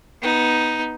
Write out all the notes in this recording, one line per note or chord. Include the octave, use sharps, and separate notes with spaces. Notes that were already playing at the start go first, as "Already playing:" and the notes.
B3 D#4